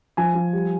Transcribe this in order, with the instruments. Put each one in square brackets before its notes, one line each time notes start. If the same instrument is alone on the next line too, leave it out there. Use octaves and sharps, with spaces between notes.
[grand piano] F3 G#5
F3
G3